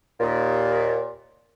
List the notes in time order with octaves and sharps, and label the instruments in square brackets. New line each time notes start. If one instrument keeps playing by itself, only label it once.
[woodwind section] D#2 A#2